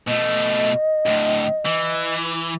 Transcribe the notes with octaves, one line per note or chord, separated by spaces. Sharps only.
B2 A3 D#5
D2 A2
E3